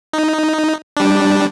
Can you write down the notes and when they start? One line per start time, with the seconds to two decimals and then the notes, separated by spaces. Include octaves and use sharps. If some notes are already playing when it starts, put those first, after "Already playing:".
0.13 D#4
0.97 G3 D4